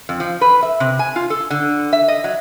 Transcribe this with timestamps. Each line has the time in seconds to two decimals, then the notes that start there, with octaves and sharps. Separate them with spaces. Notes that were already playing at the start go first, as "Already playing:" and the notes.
0.09 F2
0.20 F3
0.41 B4
0.63 E5
0.80 C3
0.99 G#5
1.16 F4
1.30 A4
1.50 D3
1.93 E5
2.08 D#5
2.24 F#3